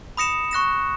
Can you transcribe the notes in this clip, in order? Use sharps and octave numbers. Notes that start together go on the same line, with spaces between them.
B5 D#6 A#6 C#7 E7
C#6 F#6 A#6 E7